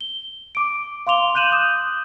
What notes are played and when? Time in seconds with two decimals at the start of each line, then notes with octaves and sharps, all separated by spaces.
0.01 G7
0.55 D6 D7
1.07 F5 C6 D6 F7 G7
1.34 C6 F#6 G6 D#7 E7 F#7
1.52 D6 D#6 G6